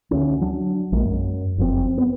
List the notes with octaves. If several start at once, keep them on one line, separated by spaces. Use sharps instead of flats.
D2 C#4
F#3 D4
A#1 G#3 A#3
F#2
F#1 F2 C4
B3